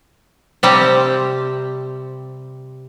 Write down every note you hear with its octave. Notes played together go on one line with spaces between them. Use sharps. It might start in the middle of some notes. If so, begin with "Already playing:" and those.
C3 G3 C4